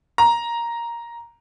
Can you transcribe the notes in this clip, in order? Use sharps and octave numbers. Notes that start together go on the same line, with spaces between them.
A#5